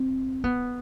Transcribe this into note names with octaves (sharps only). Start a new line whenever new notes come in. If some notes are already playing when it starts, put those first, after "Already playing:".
Already playing: C4
B3